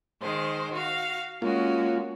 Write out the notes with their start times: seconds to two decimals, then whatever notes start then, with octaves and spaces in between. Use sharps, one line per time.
0.22 D#3 G#3 C5
0.73 F#4 F5
1.42 G#3 A#3 C#4 F4 F#4